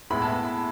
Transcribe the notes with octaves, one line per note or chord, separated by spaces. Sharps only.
A2 G#3 B3 E4 B5
A5